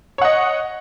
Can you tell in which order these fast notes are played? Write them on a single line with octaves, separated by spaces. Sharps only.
C#5 F#5 D#5